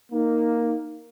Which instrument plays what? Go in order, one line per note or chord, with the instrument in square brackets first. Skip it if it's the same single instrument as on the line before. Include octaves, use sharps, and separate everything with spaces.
[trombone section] A#3 [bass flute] D#4